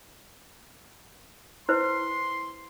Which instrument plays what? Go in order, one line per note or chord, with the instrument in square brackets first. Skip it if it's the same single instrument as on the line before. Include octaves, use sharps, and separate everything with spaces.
[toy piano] E4 B4 C5 [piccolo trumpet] C6